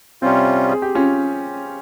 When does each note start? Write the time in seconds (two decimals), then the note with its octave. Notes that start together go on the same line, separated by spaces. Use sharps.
0.22 C3 G3 C4 C#4 F4
0.69 G#4
0.82 G4
0.95 C#4 F4